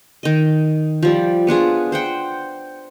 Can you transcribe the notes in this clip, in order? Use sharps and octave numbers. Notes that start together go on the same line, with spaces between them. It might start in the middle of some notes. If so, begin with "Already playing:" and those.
D#3 D#5
F3 G3 D5
B3 D4 F4 G#4
C5 F#5 G5